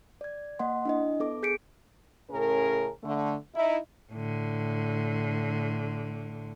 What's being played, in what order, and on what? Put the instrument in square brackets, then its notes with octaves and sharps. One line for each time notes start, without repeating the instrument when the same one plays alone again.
[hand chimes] D5 G#6
A#3 D#5 F#5 C6
D4 E4 D#5
B3 A4 D6
G#4 G6 B6 C#7 D7
[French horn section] A2 C#3 C#4 G#4 A#4
D3 A3
D#4 E4
[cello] A2 D3